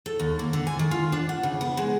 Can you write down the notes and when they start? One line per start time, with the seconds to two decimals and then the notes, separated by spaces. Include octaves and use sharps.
0.06 A4
0.19 D#2
0.39 A#3
0.53 D3
0.67 G#5
0.79 D#3
0.91 F4
1.12 D4
1.29 F#5
1.43 C#3
1.61 B3
1.77 G#3